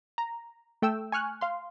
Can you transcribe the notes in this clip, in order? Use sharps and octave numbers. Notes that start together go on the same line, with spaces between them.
A#5
A3 G5 E6
G#5 C#6 F6 F#6
F5 C6